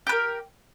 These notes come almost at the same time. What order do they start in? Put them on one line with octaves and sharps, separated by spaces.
G4 B4 A#4